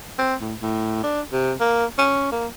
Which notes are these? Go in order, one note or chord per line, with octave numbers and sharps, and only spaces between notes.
C4
A2
A2
D4
C3
A#3
C#4
A#3